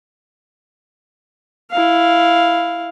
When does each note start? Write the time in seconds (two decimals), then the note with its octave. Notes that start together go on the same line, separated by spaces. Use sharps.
1.71 E4 F5